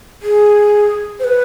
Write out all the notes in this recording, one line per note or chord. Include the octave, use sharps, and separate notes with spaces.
G#4
C5
B4